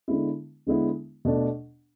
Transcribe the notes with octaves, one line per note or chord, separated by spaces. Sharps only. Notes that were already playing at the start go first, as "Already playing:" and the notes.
D3 G#3 B3 E4
D3 G#3 B3 E4
B2 A3 D4